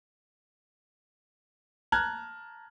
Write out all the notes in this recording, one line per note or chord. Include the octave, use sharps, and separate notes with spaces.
A5 A#5 F6 F#6 G#6